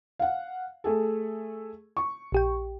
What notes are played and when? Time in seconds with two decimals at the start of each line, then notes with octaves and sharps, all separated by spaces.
0.19 F5 F#5
0.84 A3 G#4 A4
1.97 C#6
2.32 A#1 G4 G5